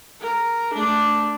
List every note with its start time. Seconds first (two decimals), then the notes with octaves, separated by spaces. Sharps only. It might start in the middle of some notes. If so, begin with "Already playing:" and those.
0.21 A#4
0.73 A3 D4